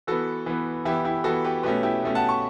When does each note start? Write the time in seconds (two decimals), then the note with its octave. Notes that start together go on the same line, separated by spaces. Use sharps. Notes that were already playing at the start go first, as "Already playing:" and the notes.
0.07 E3 B3 F#4 A4
0.46 E3 B3
0.85 E3 B3 E4 G4
1.05 E4 G4
1.24 E3 B3 F#4 A4
1.44 G4 B4
1.63 B2 A3 C#4 G4 B4
1.83 E4 G4
2.03 B2 A3 C#4
2.15 F#5 A5
2.29 A5 C#6